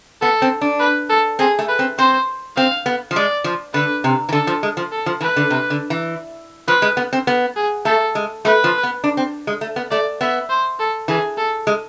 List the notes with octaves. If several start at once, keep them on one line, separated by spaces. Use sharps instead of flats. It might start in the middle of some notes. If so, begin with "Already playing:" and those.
B3 A4
C4
D4
B4
A4
C4 G#4
A3
B4
C4
C4 C5
C4 F5
B3
F3
G#3 D5
F3
D3 B4
C3
E3
D3 A4
F3
G#3
F3
A4
F3
E3 B4
D3
C3
D3
E3
F3 B4
G#3
B3
C4
B3
G#4
A3 A4
G#3
A3 B4
F3
B3
D4
C4
G#3
A3
B3
A3 D5
B3 E5
C5
A4
E3 G#4
A4
G#3